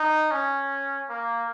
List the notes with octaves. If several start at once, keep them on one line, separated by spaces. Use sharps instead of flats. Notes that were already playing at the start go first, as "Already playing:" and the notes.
Already playing: D#4
C#4
A#3